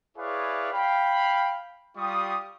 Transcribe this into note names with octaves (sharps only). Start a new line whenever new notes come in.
E4 G#4 B4 C#5 D5 F5
F5 G5 B5
G3 F4 G4 C#6 D#6